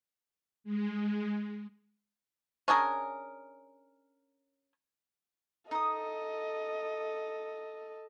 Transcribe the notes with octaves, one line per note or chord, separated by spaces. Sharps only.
G#3
C#4 D4 G#4 A#4
D#4 A4 D#5 D#6